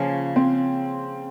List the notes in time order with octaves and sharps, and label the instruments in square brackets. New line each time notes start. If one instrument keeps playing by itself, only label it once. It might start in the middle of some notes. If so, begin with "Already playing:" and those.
Already playing: [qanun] C#3 F3 A#3 [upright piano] C#4
[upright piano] C4